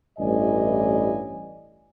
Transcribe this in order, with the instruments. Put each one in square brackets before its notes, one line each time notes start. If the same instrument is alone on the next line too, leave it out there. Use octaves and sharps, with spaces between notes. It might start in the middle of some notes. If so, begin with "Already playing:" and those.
[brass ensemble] A1 G2 E3 D5 D#5 G#5